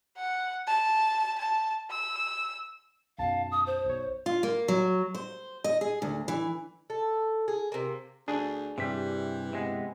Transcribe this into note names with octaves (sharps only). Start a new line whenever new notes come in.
F#5
A5
A5
E6
B1 F#2 F5 A5
D#6
C5
B1 C#5
F4
A#3
F#3
C5
D#5
G#4
D2
E3
A4
G#4
C3 A#3
D2 D4 G#4
G2 C3 E3 G3 B6
C3 G#3 B3